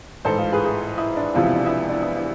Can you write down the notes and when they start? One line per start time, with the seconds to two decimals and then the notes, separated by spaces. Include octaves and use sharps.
0.25 A1 G#2 E3 A4 C5
0.38 F4 A4
0.52 G#4 B4
0.65 E4 G#4
0.98 E4
1.16 D4
1.34 E1 E2 C3 F3 F4
1.45 E4
1.55 D4
1.66 E4
1.89 D4
2.02 E4
2.17 E4